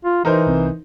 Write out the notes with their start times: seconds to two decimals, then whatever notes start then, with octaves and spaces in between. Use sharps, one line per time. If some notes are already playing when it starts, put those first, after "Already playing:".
0.04 F4
0.25 E3 D#4 A#4 C5
0.46 C2 C4